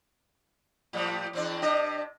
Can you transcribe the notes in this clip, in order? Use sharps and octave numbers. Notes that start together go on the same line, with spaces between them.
A2 F3 G3
E2 C4 D4
C3 D4 D#5